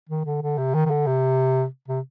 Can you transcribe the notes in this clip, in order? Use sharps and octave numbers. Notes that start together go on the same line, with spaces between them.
D#3
D3
D3
C3
D#3
D#3
D3
C3
C3